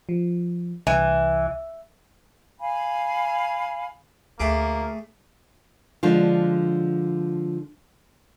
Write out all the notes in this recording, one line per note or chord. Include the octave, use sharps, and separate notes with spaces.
F3
C2 E3
F5 G#5 B5
D2 A3 A#3 G#4 D6
D3 F3 G#3 D4 F4